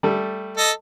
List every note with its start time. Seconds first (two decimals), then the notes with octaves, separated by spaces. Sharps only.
0.03 G3 A3
0.57 A4 D#5